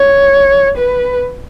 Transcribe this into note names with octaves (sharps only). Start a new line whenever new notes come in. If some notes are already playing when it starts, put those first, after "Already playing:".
Already playing: C#5
B4